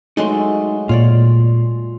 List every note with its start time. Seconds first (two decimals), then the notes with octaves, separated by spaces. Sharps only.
0.17 F#3 G#3 A3 D#4 C6
0.89 A#2 F4 C#5 D5